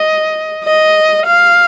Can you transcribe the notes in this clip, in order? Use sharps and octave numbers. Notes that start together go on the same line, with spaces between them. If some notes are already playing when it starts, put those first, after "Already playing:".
Already playing: D#5
D#5
F5